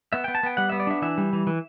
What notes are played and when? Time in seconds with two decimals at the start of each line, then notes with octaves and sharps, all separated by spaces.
0.13 B3 E5
0.24 B3 G5
0.35 A5
0.43 B3 G5
0.57 G3 F#5
0.69 B3 E5
0.80 D5
0.87 D4 E5
1.02 E3 E5
1.18 G3
1.33 E3
1.47 E3